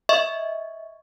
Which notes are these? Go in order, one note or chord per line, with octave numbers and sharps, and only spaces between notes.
D#5 E5 C#6